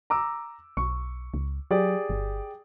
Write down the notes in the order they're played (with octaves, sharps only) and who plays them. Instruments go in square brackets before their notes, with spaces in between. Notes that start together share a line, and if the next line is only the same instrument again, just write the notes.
[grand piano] A#5 D6 E6
[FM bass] B1 [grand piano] C#6
[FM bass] C#2
[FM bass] F#3 [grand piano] G4 G#4 D5
[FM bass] G1